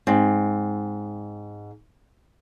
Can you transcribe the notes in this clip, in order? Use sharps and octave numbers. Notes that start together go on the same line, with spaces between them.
G#2 C4